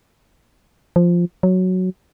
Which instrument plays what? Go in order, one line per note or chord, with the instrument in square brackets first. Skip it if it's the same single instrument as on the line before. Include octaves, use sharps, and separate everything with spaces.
[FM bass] F3
F#3